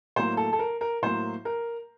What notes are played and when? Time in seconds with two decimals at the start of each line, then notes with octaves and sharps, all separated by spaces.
0.16 A2 F#3 A#3 C5
0.37 A4
0.53 A4
0.59 A#4
0.81 A#4
1.02 A2 F#3 A#3 C5
1.45 A#4